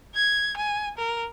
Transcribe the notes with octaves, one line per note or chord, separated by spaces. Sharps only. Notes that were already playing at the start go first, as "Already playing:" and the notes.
G#6
G#5
A#4